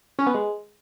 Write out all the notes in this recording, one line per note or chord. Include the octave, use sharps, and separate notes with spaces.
C#4
B3
G#3